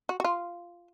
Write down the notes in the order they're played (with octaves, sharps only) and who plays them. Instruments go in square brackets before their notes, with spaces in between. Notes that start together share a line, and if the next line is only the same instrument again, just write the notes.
[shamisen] F#4
F#4
F4